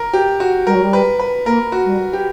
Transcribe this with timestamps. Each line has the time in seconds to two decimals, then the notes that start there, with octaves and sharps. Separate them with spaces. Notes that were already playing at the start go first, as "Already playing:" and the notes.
Already playing: A#4
0.13 G4
0.40 F#4
0.67 G3 A#4
0.75 F#3
0.82 G3
0.93 B4
1.20 B4
1.46 A#3 A#4
1.72 F#4
1.85 G3
2.13 G4